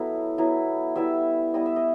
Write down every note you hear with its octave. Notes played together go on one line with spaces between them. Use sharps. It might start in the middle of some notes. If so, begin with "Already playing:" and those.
Already playing: F#3 A3 B3 E4
F#3 B3 E4
G3 B3 E4 E5
G3 B3 E4 D#5
E5
D#5